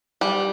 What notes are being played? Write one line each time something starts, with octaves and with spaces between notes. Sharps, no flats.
G3